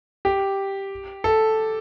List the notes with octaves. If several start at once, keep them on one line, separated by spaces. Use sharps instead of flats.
G4
A4